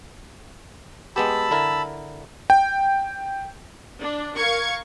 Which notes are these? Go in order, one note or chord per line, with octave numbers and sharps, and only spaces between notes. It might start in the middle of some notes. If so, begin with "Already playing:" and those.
G#3 B3 G4 A5 B5 E6
D3 E4 A#4
G5
D4
A#4 F5 C#6 G#6